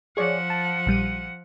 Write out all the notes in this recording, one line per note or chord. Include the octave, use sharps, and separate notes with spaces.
F3 G#4 C#5 D5 F#5
A5
A#1 G3 D#7